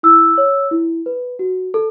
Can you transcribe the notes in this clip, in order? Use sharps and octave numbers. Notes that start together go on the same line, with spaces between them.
E4 E6
C#5
E4
B4
F#4
A4